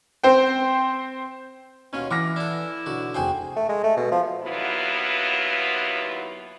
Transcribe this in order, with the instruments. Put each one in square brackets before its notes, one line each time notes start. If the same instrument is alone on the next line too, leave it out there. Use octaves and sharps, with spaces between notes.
[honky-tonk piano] C4 C5 G5
[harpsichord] D#2 B2 F4 [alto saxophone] C#4
[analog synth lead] E3 [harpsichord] E4 [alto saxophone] F#5 [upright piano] D6 F6 A#6
[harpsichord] D4 A4 [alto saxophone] E4
[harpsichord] B1 F#4 [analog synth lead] D3
[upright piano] F1 G5 G#5 [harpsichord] F#4 G#4 C5
[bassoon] A3
G#3
A3
B2
F3
[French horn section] D#2 F#3 B3 E4 F4